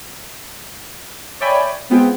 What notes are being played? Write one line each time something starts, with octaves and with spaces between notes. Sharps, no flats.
C#5 D5 E5 G5 G#5 B5
G#3 B3 C4 F4 G#4 G5